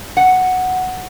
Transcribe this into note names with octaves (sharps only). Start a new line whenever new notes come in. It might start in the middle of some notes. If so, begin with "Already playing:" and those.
F#5